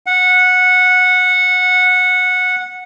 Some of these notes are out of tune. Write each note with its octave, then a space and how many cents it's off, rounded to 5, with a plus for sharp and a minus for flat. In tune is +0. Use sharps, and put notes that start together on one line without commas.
F#5 -15